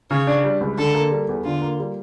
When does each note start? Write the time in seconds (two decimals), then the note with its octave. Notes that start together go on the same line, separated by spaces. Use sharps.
0.11 C#3 C#5
0.27 D4
0.44 G3
0.61 C#2
0.78 D3 A4
0.94 A#3
1.11 G3
1.29 E2
1.44 D3 F4
1.62 A#3
1.79 G3